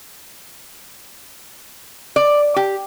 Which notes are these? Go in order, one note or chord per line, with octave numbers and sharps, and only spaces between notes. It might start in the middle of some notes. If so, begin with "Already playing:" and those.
D5
G4